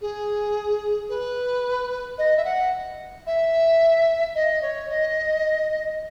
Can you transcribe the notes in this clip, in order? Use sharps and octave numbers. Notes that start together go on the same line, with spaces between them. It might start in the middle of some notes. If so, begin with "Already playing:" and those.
G#4
B4
D#5
E5
F#5
E5
D#5
C#5
D#5